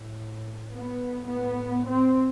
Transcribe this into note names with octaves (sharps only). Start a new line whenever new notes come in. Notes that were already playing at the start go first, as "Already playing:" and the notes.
Already playing: A2
B3
A2
B3
C4